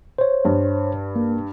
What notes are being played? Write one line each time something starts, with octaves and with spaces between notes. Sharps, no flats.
C5 C#5
G2
A#3